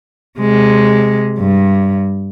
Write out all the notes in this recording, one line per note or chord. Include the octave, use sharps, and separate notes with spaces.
C3 G#3
G2